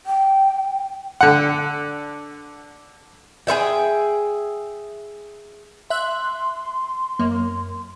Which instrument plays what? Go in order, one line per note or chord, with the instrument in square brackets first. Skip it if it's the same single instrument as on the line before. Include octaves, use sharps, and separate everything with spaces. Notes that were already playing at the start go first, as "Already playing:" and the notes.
[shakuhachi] G5
[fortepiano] D3 F#5
[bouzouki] G#4 B4 E5 G5
[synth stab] E5 F#6 [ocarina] C6
[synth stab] F#2 A#3